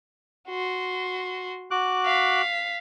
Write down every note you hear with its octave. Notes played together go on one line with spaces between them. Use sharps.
F#4 C6
F#4 D6 F#6
F5 B6